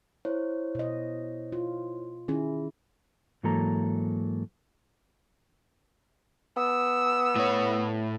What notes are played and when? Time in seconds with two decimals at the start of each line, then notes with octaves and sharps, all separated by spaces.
0.25 E4 C5 C#5
0.75 B2 D#5
1.52 F4
2.28 D#3 C#4 E4 G#4
3.43 G#2 E3 F#3 A#3 A4 A#5
6.57 B3 E6
7.36 A2 C#5